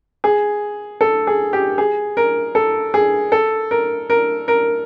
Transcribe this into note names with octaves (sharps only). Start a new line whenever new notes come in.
G#4
A4
G#4
G4
G#4
A#4
A4
G#4
A4
A#4
A#4
A#4